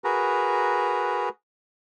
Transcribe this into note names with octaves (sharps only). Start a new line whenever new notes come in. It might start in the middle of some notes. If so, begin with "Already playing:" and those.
F#4 G#4 A#4 B4 A#5